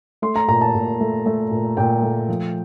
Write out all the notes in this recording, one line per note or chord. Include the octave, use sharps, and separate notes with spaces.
A3 C6
A#5
A#2 A#5
A5
A#2
A3
A3
A#2
A#2 G5
A3
F3